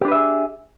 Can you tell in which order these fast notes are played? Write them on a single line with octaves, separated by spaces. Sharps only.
G4 D4 B4 E5 G#4